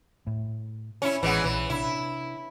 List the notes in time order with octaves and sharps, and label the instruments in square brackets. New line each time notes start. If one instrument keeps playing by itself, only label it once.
[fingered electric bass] A2
[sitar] C#4 E4
[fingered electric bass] A1 [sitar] E3 G#3 B3
[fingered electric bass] A#1 [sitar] E3
[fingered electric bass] C3 D4 [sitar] E4